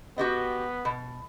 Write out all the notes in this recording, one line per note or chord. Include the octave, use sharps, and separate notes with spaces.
B3 F#4 G4 D#5
B2